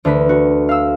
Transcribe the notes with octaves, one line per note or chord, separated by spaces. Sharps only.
D2 D4 B4 B6
F#4
F5 E6